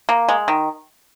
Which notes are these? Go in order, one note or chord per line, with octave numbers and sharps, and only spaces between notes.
A#3
G#3
D#3